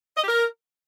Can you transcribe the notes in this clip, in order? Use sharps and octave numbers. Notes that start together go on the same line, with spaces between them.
D#5
G4
A#4